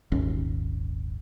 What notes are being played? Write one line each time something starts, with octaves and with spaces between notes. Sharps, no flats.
D#1 G#1 D#2 C#4